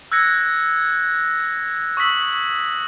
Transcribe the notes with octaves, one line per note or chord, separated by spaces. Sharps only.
E6 F#6 G#6 A#6 C#7
C#6 D#6 E6 B6 F#7